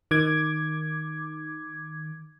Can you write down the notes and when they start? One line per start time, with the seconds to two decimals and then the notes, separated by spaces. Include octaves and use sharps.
0.11 D#3 D6 G#6